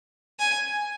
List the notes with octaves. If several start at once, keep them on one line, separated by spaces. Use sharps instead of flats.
G#5